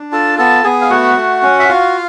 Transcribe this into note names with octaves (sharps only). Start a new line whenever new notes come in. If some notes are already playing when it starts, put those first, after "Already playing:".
Already playing: D4
F4 A4 A5
B3 A4 A5
B3 G#4 G#5
F5
A3 F#4 F#5
A3
C#4
E5
F4 F#4 F5